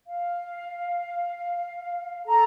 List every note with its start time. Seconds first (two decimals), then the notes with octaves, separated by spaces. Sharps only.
0.07 F5
2.26 A4 A#5